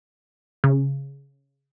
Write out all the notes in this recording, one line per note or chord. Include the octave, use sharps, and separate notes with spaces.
C#3